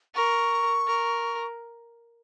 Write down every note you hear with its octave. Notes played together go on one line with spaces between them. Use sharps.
A#4 C#6
A#4